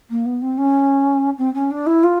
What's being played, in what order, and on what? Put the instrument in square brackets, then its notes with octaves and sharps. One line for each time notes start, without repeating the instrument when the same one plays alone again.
[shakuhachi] A#3
B3
C4
C#4
C4
C#4
D4
E4
F4